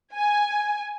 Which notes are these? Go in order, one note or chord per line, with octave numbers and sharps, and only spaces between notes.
G#5